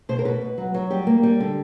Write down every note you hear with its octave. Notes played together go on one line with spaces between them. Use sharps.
B2 C5
A#4
B2 B4
B2
F#3
F#3
G3 G4
A#3
G3
D3